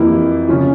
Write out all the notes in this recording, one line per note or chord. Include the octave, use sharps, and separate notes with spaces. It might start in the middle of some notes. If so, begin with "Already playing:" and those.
Already playing: F2 E3 A#3 E4 G4
C#3 F3 C#4 F4